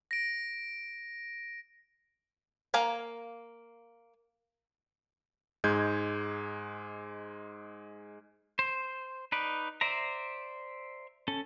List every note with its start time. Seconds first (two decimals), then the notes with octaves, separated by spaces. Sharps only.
0.11 A#6 D7
2.74 A#3 A#4 F5 G#5
5.64 G#2 G#3 G6 G#6
8.59 C5
9.32 D#4 B4 D5
9.81 C5 D5 E5 A#5
11.28 C#4 A4